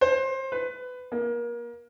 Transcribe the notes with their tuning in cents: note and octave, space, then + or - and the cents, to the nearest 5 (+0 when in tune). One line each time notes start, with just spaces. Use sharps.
C5 +25
B4 +20
A#3 +30